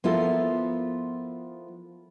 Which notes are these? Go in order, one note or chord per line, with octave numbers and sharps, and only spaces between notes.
F3 B3 E4 F4 A4 A#4